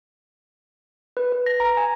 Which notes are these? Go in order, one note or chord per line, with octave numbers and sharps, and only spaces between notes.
B4
B4
A#6
A#5
G#5